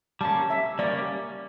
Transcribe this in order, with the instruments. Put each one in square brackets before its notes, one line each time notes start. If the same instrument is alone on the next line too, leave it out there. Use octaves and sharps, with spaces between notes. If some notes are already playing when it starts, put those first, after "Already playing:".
[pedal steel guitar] G3 A#3 C#4 [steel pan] A5
[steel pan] E5
[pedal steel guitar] G3 A#3 C#4 [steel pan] D5